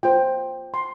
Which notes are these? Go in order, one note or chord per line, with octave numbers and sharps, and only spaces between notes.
F4 C5 G5
C6